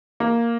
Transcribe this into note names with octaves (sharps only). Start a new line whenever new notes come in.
A#3